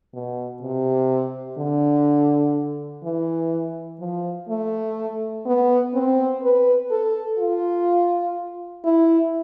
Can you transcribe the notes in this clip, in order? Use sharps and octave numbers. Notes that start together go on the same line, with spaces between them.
B2
C3
D3
E3
F3
A3
B3
C4
B4
A4
F4
E4